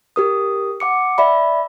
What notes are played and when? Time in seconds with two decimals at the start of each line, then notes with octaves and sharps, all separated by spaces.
0.16 G4 A#4 D#6
0.80 F#5 D6 C#7
1.18 D5 E5 B5